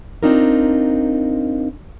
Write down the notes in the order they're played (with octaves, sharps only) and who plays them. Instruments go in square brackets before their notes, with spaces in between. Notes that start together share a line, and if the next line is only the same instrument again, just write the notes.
[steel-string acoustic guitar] C4 D4 D#4 F4 A#4